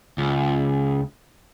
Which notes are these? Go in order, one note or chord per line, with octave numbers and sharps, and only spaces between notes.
C#2